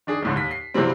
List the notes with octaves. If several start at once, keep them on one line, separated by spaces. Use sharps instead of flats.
D#3 D4 G#4
C#2 A2 D3
D#2 B6
C7
G2 C3 E3 F#3 G3 C4